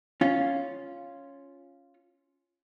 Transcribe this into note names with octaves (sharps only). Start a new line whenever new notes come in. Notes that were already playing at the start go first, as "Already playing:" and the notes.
C#4 F4